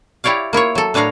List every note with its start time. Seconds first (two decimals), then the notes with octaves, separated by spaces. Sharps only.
0.24 E4 G4 C#5 D5 F5
0.53 A#3 E4 F4 C#5
0.75 F#3 A4
0.94 A2 D4 B4 C#5 F5 A#5